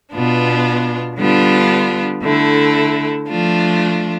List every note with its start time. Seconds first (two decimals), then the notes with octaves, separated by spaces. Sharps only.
0.12 B2 B3 D4 F4
1.17 D3 G3 B3 D4 F4
2.22 D3 A3 E4
3.28 F3 A3 D4 F4